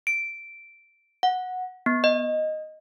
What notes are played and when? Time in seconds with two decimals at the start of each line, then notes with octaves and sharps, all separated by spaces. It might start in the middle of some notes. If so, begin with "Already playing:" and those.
0.07 D7
1.23 F#5
1.86 B3
2.04 D#5